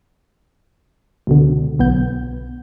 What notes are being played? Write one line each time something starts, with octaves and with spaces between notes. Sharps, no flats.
C#2 B2 D3
B1 B3 G6